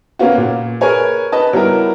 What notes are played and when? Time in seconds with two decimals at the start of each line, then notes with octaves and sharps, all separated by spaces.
0.19 A#3 B3 C#4 F4 F#4
0.37 A#2
0.81 G#4 A#4 B4 C#5 G#5
1.32 B4 D#5 A5
1.53 F#3 G3 B3 E4 A#4